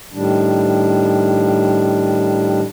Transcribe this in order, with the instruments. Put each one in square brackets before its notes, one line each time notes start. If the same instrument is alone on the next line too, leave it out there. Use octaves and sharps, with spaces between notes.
[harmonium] A2 D#3 G3 D4